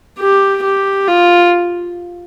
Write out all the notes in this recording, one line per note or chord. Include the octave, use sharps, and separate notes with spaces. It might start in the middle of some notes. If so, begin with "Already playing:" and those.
G4
G4
F4